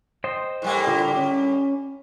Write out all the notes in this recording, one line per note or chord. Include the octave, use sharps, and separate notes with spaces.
C5 D#5 G5
A2 G3 A#3
D3 F4
C#4